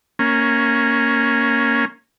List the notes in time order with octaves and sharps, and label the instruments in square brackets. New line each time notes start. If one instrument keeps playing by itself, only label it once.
[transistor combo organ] A#3 C#4